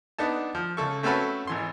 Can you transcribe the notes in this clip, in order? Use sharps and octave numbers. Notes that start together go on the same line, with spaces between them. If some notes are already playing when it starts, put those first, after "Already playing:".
B3 D4 D#4 A5
F3
C#2 A4 C#6
A3 C4 C#4 F#4 A4 B4
G#1 E3 C6